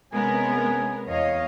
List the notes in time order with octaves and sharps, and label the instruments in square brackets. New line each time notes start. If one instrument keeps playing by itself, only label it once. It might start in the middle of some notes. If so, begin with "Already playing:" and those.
[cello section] C3 C#4 B4 [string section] G#3 B3 A#4 [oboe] G#5
[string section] E2 [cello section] C#5 D#5 F5